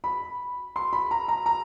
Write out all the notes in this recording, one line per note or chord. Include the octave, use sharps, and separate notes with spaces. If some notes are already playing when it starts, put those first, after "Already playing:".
B5
C6
B5
A#5
A#5
A#5